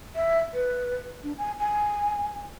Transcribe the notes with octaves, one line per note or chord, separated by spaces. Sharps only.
E5
B4
D4
G#5
G#5